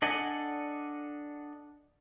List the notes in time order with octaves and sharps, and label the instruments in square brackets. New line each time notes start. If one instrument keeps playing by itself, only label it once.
[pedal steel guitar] D4 A4 D#5 F#5 G#5